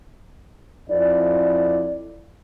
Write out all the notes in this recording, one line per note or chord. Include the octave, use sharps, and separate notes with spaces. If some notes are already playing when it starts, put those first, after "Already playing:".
F2 E4 D5